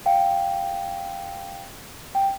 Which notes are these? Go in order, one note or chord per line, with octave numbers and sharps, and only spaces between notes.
F5 G5
G5